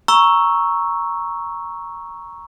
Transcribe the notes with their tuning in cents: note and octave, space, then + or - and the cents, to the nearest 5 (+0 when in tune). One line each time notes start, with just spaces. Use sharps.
A#5 +10 C#6 +0 E6 +0